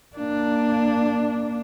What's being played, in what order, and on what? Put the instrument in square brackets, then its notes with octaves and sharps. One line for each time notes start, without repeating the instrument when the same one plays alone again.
[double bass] A#3 D4